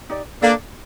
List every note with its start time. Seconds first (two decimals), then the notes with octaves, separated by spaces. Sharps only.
0.10 D#4 G4 D5
0.42 A#3 D4 A4 D5 F5